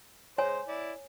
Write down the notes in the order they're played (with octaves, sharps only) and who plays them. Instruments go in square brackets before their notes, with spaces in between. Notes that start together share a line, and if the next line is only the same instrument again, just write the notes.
[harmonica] G#3 C5 [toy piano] C#5 G#5
[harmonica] E4 D5